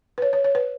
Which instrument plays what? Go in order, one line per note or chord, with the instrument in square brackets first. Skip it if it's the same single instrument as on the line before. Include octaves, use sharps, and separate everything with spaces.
[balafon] B4
C#5
C#5
C#5
B4